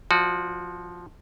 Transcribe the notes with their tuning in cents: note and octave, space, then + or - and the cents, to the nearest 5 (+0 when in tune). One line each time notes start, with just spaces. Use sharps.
F3 +5 F#4 -15 D5 +35